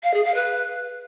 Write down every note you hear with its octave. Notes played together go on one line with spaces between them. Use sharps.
F5
G#4
F5
B4